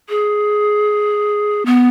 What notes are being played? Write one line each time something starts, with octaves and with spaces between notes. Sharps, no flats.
G#4
B3